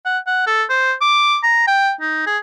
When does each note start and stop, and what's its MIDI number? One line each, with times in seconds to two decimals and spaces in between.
0.06 0.18 78
0.27 0.45 78
0.47 0.64 69
0.70 0.94 72
1.01 1.38 86
1.43 1.66 82
1.67 1.92 79
2.01 2.26 63
2.27 2.38 68